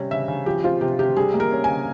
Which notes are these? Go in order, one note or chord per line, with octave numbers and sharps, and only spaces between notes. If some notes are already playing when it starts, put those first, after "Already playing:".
Already playing: C3 G3 C#4
C#3 E5
C#3
F3 G4
C4 F4
C3 G4
C3 G4
G3 G#4
A#3
A#4
C#4
G#5
C#3